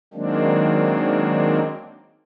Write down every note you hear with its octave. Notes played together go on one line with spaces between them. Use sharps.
D#3 F#3 G#3 A#3 C4 D4